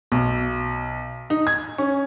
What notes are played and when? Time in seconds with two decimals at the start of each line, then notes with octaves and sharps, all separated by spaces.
0.12 B1
1.30 D#4
1.47 G#6
1.78 C#4